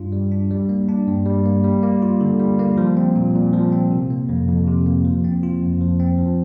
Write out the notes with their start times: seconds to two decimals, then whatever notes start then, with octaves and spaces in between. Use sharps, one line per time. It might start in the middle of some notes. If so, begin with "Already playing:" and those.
Already playing: G2 G3 D4 F4
0.12 G3
0.32 D4
0.50 G3
0.69 A#3
0.89 D4
1.07 G2
1.26 G3
1.46 A#3
1.64 G3
1.83 A#3
2.02 F4
2.21 D3
2.40 G3
2.59 A#3
2.77 F3
2.97 C4
3.16 A#2
3.35 A#2
3.53 F3
3.72 C4
3.92 C3
4.10 A#3
4.29 F2
4.48 F2
4.67 C3
4.87 A#3
5.05 F3
5.24 C4
5.43 F4
5.62 F2
5.81 F3
6.00 C4
6.19 F3